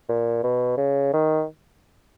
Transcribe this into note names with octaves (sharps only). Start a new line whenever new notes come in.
A#2
B2
C#3
D#3